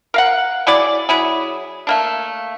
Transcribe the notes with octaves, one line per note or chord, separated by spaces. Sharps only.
A#4 F5 F#5
F#3 E4 G#4 D5
F#3 E4 G#4
A3 A#3 D4